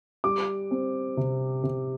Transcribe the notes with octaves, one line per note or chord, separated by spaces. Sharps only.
G3 D6
C4
C3
C3